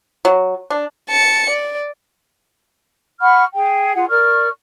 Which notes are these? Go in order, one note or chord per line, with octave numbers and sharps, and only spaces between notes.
F#3
D4
A5 C#7
D5
F#5 B5 C#6 F6
G#4 G5
F4 G#4 F#5
A#4 D5 C#6 F6